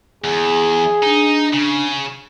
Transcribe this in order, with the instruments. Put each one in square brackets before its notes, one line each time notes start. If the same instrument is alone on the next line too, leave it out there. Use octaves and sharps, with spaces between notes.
[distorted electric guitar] E2 [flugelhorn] G#4
[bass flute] D4 [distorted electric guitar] D#4
[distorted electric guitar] C#3